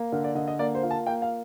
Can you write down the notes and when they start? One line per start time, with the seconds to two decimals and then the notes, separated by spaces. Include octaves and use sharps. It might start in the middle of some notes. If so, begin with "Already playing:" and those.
Already playing: A#3
0.12 D3 A#4
0.24 D5
0.35 D3 D#5
0.48 D#5
0.59 A#3 D5
0.75 C5
0.83 F4
0.91 A5
1.06 A#3 G5
1.22 F5